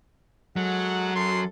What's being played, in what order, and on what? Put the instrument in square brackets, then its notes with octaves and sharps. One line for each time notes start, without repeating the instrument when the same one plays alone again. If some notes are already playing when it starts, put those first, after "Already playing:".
[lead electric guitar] F#3 [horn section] G#3 A4 F#5
[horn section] F#2 A4 C6